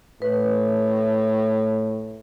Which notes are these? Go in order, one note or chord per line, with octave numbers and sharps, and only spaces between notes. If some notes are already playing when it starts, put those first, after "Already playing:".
A2 B4